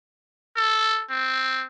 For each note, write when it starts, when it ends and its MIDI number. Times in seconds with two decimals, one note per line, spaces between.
0.56 1.04 69
1.09 1.66 60